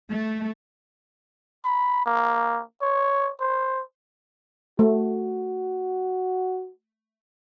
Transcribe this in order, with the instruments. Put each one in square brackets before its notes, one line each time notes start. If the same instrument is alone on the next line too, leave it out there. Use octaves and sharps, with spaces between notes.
[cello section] A3
[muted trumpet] B5
A#3
C#5
C5
[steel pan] A3 [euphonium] F#4